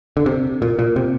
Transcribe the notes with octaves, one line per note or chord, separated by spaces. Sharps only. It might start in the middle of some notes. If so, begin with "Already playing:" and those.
D3
C3
A#2
A#2
C3